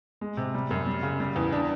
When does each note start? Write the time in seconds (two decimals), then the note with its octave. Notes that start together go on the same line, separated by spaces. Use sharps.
0.21 G#3
0.37 C3
0.54 G3
0.71 F#2
0.86 G3
1.03 C#3
1.20 G3
1.36 E2
1.52 D4